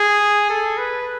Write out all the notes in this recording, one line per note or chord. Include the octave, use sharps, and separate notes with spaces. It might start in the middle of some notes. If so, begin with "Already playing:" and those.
Already playing: G#4
A4
B4